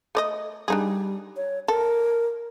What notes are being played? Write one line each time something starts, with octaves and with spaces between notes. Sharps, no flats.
A3 D5 D#5
G3 D4 D#4 G#4
C#5
A4 A#4